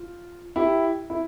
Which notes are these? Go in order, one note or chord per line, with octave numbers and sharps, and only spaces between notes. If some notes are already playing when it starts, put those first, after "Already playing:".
Already playing: F4
E4 G4
E4